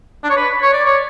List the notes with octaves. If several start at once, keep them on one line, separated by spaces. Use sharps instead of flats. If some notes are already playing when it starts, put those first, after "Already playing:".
D4
C#5
B4
C#5
D5
C#5